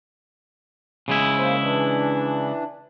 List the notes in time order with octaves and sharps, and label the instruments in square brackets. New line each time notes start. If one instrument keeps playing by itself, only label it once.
[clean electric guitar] C#3 G#3 E4
[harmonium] A#3 C5
E3 D4